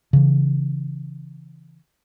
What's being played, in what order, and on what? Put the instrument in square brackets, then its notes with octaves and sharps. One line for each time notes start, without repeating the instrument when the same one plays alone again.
[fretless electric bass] C#3 E3